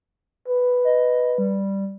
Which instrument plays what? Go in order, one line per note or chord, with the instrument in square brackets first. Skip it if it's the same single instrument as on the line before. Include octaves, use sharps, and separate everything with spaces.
[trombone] B4
[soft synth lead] D#5
G3